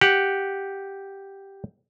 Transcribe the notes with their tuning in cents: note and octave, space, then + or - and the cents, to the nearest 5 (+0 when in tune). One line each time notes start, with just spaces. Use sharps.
G4 +0 F#5 +0